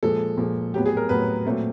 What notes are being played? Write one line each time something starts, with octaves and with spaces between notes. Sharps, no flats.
A#2 F3 G#3 A4
A#2 F3 G#3
A2 F#3 B3 G4
G#4
A#4
A2 F#3 B3 B4
A#2 F#3 A3 C4